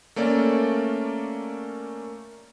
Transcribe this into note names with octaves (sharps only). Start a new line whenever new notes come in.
A3 A#3 C#4 D5